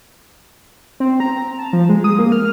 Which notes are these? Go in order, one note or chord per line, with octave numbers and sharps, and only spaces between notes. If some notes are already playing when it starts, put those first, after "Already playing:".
C4
A#5
A5
F3
G#3
D#6
A#3
F6